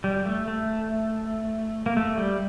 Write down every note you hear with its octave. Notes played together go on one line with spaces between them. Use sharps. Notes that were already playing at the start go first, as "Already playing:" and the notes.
G3
A3
A3
A#3
A3
G3